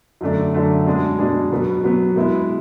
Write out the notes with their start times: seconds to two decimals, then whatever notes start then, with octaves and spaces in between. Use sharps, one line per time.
0.21 F#2 D3 A3 D4
0.54 F#2 D3 A3 D4
0.85 B2 G#3 D4 G#4
1.19 B2 G#3 D4 G#4
1.51 B2 F#3 B3
1.83 B2 F#3 B3
2.16 B2 G#3 B3 E4